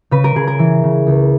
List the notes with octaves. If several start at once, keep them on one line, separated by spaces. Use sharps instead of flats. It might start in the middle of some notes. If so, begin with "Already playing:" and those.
C#3 B4
A#4
C#3 G#4
A#4
E3
C#3
C#2